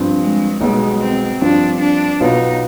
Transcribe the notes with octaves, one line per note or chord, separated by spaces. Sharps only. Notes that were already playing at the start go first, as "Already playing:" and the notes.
Already playing: G2 F3 C4 F4
G#3
B1 B2 G3 G#3
C4
G2 F3 C4 D4
D4
B1 B2 B3 D#4 F4